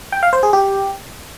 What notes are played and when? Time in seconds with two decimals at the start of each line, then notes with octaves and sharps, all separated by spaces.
0.12 G5
0.23 F5
0.33 C5
0.43 G#4
0.53 G4